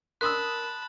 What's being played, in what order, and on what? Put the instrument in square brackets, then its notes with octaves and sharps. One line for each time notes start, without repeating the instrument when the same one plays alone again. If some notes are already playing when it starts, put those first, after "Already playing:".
[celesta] A#4 B6 [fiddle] A5 B5 [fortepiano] C6 D#6 E6 [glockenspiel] F#6